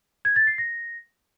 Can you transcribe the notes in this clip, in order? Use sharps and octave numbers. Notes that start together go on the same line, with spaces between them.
G#6
A6
C7
A#6